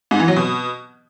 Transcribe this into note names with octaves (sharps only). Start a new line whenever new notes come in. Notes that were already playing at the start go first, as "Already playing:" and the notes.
G#2
E3
F#3
B2